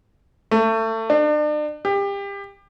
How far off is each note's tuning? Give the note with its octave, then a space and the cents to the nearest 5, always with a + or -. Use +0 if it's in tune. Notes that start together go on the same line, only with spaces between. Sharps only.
A3 +30
D4 +40
G4 +30